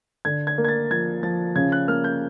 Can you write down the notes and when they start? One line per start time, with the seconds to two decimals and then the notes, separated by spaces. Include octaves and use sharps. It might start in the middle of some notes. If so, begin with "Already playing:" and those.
0.25 D3 G#6
0.47 G#6
0.58 A#3
0.64 G#6
0.68 A6
0.90 F3 G#6
1.23 F3 A6
1.56 C#3 G#6
1.72 F#6
1.88 A#3 F6
2.04 G6